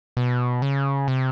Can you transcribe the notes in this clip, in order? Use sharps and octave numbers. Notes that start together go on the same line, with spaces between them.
B2
C#3
C3